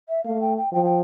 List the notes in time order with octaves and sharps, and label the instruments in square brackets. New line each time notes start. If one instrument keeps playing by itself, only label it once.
[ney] E5
[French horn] A3 [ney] F5
[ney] G5
G5
[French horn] F3 [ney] G5
[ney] G5